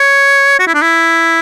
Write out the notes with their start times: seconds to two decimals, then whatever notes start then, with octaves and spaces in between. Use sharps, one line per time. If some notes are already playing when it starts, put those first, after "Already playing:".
Already playing: C#5
0.59 F#4
0.67 E4
0.74 D4
0.82 E4